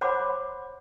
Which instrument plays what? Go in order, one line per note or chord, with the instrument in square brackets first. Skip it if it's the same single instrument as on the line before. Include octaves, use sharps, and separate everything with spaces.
[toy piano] C5 C#5 F#5 B5 C6 D6